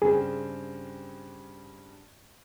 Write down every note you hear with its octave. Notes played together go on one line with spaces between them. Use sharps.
G2 C#3 C4 G#4